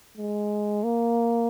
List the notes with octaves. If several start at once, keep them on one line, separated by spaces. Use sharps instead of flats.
G#3
A#3